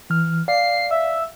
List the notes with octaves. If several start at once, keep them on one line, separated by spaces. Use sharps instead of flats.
E3 F6
D5 F5 C7
E5